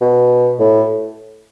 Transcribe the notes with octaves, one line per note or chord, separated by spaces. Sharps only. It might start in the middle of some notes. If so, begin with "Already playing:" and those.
B2
A2